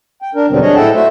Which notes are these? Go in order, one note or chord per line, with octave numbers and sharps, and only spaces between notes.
G5
D4 A#4
E2 B2 D3 F#3 G3 C4
F#3 D4 G#4 C#5 D#5
A2 E4 A4 F#5 G5 A5
A3 F#4 C5 E5